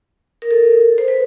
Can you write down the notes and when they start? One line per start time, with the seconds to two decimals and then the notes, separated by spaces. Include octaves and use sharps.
0.42 A#4
0.51 A4
0.98 C5
1.08 B4